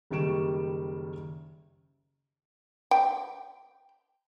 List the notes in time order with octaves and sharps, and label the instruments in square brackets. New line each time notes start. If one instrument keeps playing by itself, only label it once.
[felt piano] F#1 D#3 G3 C#6 D7 E7
[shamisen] G5